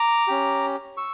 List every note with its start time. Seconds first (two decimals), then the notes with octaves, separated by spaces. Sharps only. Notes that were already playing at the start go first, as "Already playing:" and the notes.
Already playing: A#5 D6
0.28 C#4 G4
0.97 C#6 E6